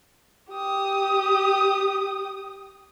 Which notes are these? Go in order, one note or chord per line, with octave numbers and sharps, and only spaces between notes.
G4 D#6